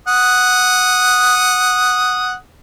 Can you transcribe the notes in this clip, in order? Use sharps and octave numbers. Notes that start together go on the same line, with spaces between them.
F#5 D#6